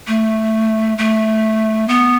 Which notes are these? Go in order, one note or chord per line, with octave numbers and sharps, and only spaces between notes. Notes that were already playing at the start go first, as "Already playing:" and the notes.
A3
A3
B3